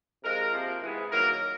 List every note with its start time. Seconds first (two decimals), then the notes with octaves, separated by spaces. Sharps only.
0.23 C3 F3 G#3 A#4
0.52 C3 F3 A#3
0.82 G#2 E3 G#3 B3
1.11 D#3 F#3 A#3 A#4